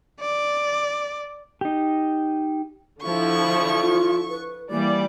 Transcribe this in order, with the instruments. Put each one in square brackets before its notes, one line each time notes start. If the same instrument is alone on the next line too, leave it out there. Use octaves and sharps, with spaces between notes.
[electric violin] D5
[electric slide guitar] D#4 G4
[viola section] D3 F3 E4 [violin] C#6
[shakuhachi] F4
B4
[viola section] E3 G3 D5 [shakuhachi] A#3